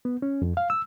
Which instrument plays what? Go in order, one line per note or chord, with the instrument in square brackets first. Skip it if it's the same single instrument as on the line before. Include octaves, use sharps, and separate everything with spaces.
[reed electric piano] B3
C#4
F2
F5
E6